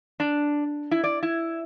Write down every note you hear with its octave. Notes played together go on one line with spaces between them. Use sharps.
D4
E4
D5
E4